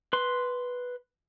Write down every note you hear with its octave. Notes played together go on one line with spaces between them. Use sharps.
B4 C6